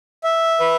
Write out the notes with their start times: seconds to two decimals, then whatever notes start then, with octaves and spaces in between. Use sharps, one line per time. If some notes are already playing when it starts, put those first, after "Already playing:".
0.24 E5
0.60 B4